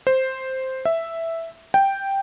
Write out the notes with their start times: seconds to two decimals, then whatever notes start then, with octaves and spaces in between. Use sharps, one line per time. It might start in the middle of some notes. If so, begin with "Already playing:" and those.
0.07 C5
0.85 E5
1.74 G5